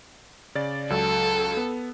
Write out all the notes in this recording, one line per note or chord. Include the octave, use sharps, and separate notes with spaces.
C#3 D5 A6
C#2 F#3 A4 E6
B3